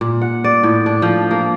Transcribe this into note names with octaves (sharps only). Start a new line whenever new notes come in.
A#2
F#5
D5
A2
D4
F3
A#3